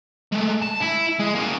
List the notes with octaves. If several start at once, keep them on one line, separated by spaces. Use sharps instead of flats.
G#3 A3
A5
E4
G#3
A#3 C#4